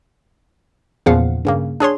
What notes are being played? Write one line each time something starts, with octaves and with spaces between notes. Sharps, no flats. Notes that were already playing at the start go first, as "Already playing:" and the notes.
E2 A#2 C#3 F3 F5 F#5
G2 C#3 A#3
D4 G#4 C#5 C6